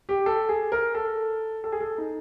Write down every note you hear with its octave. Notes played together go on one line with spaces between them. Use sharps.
G4
A4
G#4
A#4
A4
A4
G#4
A4
D#4